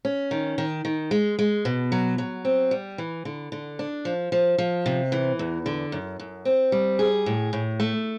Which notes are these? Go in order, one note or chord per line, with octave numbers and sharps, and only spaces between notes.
C#4
D#3
D#3
D#3
G#3
G#3
B2
F#3
F#3
C4
G3
E3
D3
D3
D4
F3
F3
F3
C3
E3
E2
D3
F#2
F#2
C4
G3
G#4
A2
A2
A3